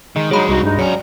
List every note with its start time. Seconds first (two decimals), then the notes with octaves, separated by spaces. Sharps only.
0.16 D#3 G#3
0.31 G2 F#3 G#3 D#4 G#4 B5
0.49 C2 D#4 F#4
0.63 G2 G#3 D#4
0.79 G2 F#3 G3 C#4 A#5 C#7